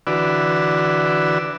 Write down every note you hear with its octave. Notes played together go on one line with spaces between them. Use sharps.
D3 E3 F#4 B4 D5 E6